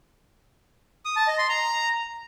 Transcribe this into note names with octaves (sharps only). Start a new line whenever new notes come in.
D#6
A5
D#5
C6
A#5